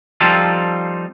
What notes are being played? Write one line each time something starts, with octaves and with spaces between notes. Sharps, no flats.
F3 G3 C4 D#4 F4 A4